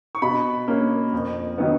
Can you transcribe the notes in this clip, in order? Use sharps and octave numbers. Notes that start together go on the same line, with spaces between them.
C#6
B2 B5
A#3 C#4
F2
D#3 F#3 B3